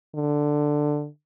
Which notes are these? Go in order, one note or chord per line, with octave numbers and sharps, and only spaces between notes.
D3